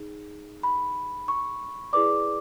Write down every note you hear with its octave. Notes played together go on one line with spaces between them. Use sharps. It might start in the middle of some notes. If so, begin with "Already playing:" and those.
Already playing: D#4 G#4
B5
C#6
E4 G#4 B4 D5 D6